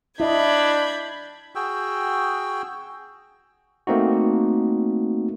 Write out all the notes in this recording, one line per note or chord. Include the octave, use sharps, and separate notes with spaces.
D4 E4 D#5 B5 G6 G#6
F#4 G#4 G5 E6
A3 A#3 C4 D#4 F#4